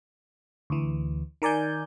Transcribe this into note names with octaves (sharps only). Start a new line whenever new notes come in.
D2 E3
D#3 A#4 D5 G#5 G6